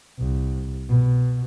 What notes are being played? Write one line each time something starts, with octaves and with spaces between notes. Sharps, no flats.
C2
B2